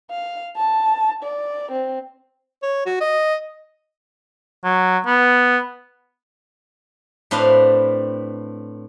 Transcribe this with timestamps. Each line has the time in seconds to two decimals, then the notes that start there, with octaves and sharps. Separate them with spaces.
0.11 F5
0.57 A5
1.23 D5
1.71 C4
2.63 C#5
2.86 F#4
3.01 D#5
4.64 F#3
5.06 B3
7.31 A2 C4 D4 B4 F5